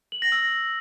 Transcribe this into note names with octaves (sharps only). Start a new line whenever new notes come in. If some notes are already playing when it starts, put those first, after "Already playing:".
F#7
A#6
E6